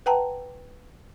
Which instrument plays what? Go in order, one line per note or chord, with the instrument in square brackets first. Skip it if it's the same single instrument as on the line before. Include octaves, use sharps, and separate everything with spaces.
[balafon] B4 F#5 G5 A5 A#5